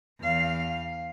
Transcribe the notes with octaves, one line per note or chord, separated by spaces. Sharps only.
E2 F5